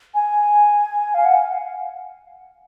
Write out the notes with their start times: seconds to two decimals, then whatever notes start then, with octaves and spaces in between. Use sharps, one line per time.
0.15 G#5
1.14 F5
1.25 F#5